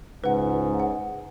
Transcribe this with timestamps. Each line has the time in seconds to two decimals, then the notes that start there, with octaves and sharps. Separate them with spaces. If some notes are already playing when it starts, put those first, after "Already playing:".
0.24 C#2 G#2 B4 F#5
0.80 F#5